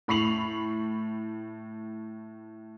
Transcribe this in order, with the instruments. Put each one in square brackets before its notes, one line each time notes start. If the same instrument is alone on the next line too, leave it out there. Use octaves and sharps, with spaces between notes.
[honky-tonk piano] A2 B5 C#6 C7 F7 F#7